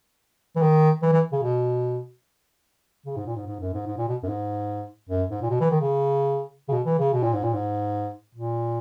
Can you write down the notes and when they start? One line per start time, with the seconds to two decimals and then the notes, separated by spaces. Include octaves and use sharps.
0.56 E3
0.62 D#3
1.02 E3
1.12 E3
1.32 C#3
1.42 B2
3.06 C#3
3.16 G#2
3.26 A#2
3.36 G#2
3.47 G#2
3.60 F#2
3.73 G#2
3.87 G#2
3.98 A#2
4.08 B2
4.23 F#2
4.28 G#2
5.09 F#2
5.30 G#2
5.42 A#2
5.50 B2
5.60 E3
5.70 D#3
5.81 C#3
6.68 C#3
6.72 B2
6.85 E3
6.99 C#3
7.13 B2
7.23 A#2
7.33 G#2
7.43 A#2
7.53 G#2
8.34 A#2